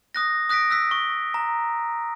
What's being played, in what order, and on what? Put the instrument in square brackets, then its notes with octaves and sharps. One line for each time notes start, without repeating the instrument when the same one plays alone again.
[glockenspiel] D#6 F#6 A#6
D#6 F#6 A#6 B6 D7
E6 F#6 B6
C#6
A#5